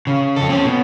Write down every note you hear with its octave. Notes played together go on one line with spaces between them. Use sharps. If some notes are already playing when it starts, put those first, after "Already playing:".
C#3
F2 A4
C4 C#4
B2